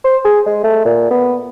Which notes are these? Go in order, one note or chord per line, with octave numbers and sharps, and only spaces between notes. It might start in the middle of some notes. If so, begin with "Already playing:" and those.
C5
G#4
G#3
A3
A#2
B3